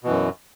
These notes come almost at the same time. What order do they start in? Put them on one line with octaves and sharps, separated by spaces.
B2 E3 F#2